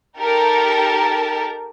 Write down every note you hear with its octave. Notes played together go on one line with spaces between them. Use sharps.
D#4 G4 A4 A#4 A5